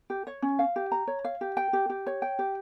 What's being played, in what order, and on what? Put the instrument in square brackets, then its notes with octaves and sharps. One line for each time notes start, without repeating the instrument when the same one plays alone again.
[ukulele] G4
C#5
C#4
F5
G4
A#5
C#5
F5
G4
G5
G4
G4
C#5
G5
G4